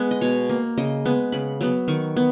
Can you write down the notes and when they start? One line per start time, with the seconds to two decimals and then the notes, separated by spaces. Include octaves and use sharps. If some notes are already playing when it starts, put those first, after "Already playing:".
Already playing: G#3 B3
0.11 D#5
0.21 B2 C#5
0.49 A#3
0.78 C#3 D#5
1.05 G#3 B3
1.32 C#3 B5
1.61 F#3 B3
1.88 D#3 C#6
2.16 B3